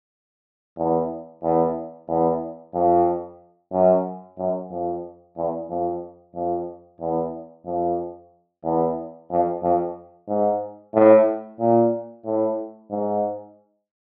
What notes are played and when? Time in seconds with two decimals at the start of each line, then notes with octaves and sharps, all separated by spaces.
0.77 E2
1.43 E2
2.09 E2
2.74 F2
3.72 F#2
4.38 F#2
4.70 F2
5.37 E2
5.69 F2
6.35 F2
7.01 E2
7.66 F2
8.64 E2
9.30 F2
9.63 F2
10.28 G#2
10.94 A2
11.59 A#2
12.25 A2
12.91 G#2